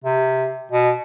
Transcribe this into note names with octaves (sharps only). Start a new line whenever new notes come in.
C3
B2